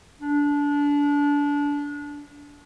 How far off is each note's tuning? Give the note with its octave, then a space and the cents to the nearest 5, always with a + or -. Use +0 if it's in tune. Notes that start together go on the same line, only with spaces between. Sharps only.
D4 -25